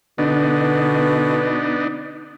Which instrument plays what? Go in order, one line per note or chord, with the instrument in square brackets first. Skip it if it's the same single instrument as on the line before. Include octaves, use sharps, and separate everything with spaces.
[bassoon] B2 [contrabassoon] D3 [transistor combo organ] B3 D4 D#4